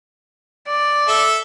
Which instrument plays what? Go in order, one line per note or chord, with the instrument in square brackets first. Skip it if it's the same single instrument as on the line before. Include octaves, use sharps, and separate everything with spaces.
[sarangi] D5
[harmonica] A4 E5